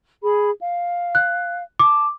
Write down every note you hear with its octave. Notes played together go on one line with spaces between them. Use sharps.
G#4 B5
F5
F#6
A5 D6